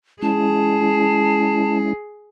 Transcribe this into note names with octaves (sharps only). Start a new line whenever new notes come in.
G#3 C#4 E4 G#4 A5